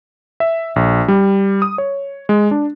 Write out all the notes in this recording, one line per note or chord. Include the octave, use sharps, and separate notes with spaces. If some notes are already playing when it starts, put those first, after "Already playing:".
E5
A#1
G3
D#6
C#5
G#3
D4